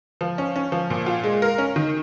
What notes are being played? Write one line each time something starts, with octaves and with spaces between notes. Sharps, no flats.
F3
C#4
C#4
F3
A#2
F4
G#3
A#4
C#4
D#3